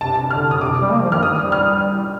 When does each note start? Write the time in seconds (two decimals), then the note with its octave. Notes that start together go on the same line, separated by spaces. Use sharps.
0.01 C3 A5
0.16 A5
0.31 D3 F6
0.51 D#6
0.61 C3 D6
0.82 G3
0.92 A#3
1.02 F3
1.11 D#3 F6
1.23 D#6
1.37 G3
1.52 F6